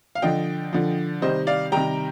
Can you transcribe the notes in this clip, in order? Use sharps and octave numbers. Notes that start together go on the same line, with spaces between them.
F5
D3 F3 D#5 G5
D3 F3
C3 D#3 G3 C5 D#5
D5 F5
C3 D#3 G3 G5 A#5